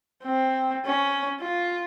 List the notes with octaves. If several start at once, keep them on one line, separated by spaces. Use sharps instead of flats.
C4
C#4
F4